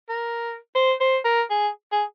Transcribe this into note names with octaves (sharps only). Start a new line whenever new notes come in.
A#4
C5
C5
A#4
G#4
G#4